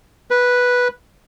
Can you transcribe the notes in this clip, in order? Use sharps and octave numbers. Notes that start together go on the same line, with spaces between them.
B4